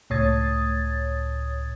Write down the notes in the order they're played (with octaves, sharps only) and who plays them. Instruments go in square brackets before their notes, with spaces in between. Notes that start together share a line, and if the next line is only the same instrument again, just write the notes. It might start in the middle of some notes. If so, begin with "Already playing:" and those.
[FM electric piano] C#2 A2 C#5 D#6 G#6 A6